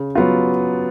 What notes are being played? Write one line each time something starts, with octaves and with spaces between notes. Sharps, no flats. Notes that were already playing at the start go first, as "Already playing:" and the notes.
Already playing: C#3
F#3 B3 F4